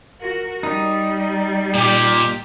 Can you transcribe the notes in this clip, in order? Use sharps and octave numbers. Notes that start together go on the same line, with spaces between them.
F#4 A#4
G3 D#4
A#2 G4